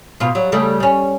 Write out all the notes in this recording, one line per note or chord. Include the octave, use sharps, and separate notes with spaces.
B2 F4
F#3 G3
C#3 G3 A3
G3 C#4